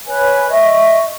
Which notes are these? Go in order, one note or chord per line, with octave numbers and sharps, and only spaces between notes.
B4 C#5 G#5
D#5 E5 C#6